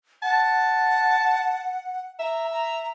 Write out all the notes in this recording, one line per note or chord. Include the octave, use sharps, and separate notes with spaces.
F#5 A5
E5 A#5
A#5